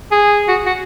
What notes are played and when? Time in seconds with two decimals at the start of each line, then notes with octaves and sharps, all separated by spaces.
0.12 G#4
0.48 F#4
0.66 F#4